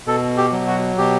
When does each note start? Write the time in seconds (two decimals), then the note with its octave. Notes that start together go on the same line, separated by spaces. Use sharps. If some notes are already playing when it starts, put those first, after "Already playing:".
0.06 B2 A4
0.37 G4
0.52 F#3
0.67 F#4
0.98 B2 G4